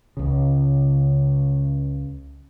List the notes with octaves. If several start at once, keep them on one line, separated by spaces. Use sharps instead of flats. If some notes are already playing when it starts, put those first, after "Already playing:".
C#2 C#3